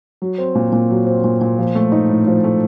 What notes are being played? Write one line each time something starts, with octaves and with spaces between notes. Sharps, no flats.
F#3
C4
A#2
A#2
F#3
C4
A#2
A#2
F3
A3
D#4
A2
F3
A3